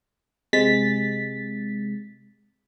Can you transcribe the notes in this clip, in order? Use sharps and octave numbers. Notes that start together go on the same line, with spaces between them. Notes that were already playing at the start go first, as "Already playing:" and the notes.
C3 G#3 A6 B6